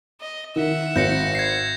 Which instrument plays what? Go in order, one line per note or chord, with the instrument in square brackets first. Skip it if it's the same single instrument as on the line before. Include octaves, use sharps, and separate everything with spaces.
[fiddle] D#5
[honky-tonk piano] D#3 [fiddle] E5 F#5
[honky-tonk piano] G#1 [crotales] G6 A#6 C#7
[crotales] G#6 C7